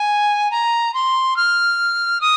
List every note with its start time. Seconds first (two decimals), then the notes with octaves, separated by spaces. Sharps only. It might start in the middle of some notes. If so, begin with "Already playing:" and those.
Already playing: G#5
0.51 A#5
0.94 C6
1.37 F6
2.21 D#6